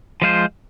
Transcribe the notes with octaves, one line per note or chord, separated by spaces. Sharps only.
F3 G#3 F4 C5